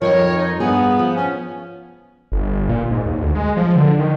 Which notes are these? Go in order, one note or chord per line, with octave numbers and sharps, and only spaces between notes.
F2 G#2 F3 D#4 A#4 C#5
D#4
G2 B3 G#4
F3
C#4
G1
A#2
G#2
D#2
D2
G#3
F3
D3
D#3